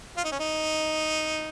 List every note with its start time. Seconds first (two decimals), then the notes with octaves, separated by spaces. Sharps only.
0.17 F4
0.24 D#4
0.31 C#4
0.39 D#4